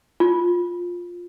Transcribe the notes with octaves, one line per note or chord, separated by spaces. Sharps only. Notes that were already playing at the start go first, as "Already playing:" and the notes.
F4